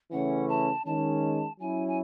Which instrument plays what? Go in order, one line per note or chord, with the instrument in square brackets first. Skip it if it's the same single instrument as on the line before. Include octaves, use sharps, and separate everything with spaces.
[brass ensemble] C#3 E3 A3 C#4 [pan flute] F#5
[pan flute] A5
[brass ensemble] D#3 G#3 C#4 [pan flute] A5
[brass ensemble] F#3 C#4 E4 [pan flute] G#5
[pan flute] G#5